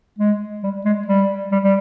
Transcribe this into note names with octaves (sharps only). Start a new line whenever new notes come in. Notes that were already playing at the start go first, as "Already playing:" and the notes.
G#3
G3
G#3
G3
G3
G3